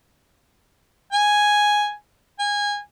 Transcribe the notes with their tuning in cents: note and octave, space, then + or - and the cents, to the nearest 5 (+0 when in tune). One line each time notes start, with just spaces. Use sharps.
G#5 +0
G#5 -20